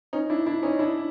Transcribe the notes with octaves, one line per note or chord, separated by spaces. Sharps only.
C#4 D#4
D4 E4
D4 E4
C#4 D#4
D4 E4